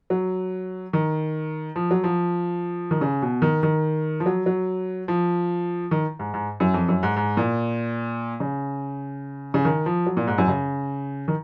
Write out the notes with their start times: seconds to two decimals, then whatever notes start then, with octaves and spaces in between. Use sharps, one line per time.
0.10 F#3
0.93 D#3
1.76 F3
1.91 F#3
2.04 F3
2.91 D#3
3.01 C#3
3.22 B2
3.42 D#3
3.63 D#3
4.20 F3
4.26 F#3
4.46 F#3
5.08 F3
5.91 D#3
6.19 G#2
6.34 G#2
6.60 F#2
6.74 F2
6.88 F#2
7.03 G#2
7.16 G#2
7.37 A#2
8.40 C#3
9.54 C#3
9.65 D#3
9.86 F3
10.06 F#3
10.17 A#2
10.27 G#2
10.38 F#2
10.48 C#3
11.28 D#3